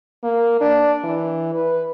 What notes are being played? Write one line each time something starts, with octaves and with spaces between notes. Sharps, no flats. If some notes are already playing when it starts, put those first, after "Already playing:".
A#3
D4
E3
B4